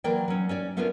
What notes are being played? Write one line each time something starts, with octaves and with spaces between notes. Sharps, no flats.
E3 F#3 A#3 A#4 D5 G5
F#3 C#4
C#4 C#5 D5
A3 B3 C#4 D4 F4 A#4